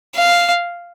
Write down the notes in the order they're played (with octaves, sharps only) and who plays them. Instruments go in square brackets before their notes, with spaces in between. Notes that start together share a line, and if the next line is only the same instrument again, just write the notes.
[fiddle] F5